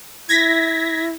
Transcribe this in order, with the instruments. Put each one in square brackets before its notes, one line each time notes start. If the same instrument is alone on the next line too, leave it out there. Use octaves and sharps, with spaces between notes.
[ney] E4 [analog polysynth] G#6 A#6 B6